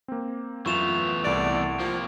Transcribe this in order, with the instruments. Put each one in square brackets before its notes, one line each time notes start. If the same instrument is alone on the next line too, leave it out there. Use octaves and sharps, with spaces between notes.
[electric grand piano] A#3 C4
[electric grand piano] F#2 F4 [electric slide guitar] E3 A3 B3 [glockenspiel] C#6 E7 F7
[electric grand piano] C2 A4 A6 [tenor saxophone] D5 [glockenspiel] D7
[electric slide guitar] C3 A#3 [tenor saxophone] F3